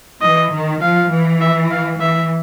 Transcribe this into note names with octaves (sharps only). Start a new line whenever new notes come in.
E3 D#5
D#3
F3 F5
E3
E5
F5
E3 E5